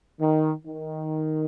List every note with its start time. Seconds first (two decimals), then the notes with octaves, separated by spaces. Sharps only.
0.20 D#3
0.65 D#3